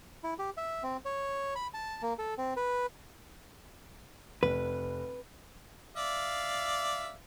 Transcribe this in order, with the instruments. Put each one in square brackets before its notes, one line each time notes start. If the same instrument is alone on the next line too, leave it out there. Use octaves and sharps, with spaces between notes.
[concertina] E4
G4
E5
C4
C#5
B5
A5
A#3
A4
C4
B4
[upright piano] F1 [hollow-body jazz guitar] B4
[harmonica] D5 E5 F5